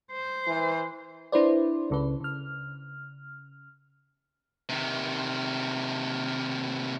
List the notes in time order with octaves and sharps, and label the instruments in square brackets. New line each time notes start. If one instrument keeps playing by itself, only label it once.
[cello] C5
[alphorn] E3
[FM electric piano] D4 E4 B4 C5 D5
C#2 C#3 B4
C#3 F6
[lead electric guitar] C3 D#3